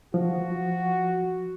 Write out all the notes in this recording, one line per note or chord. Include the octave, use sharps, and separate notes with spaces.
F3 F#4